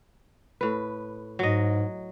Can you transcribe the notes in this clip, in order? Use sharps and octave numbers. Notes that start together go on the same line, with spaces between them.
A2 B4
G#2 F#3 D#5